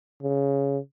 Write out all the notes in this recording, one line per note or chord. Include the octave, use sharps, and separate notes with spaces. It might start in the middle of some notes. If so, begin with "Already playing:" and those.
C#3